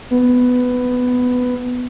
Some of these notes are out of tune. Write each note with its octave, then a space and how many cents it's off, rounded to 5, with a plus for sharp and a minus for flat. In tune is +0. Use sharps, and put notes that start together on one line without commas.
B3 +10